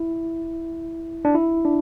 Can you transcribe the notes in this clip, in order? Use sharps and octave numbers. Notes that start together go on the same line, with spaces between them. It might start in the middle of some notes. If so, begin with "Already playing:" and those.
Already playing: E4
D4
E4
D4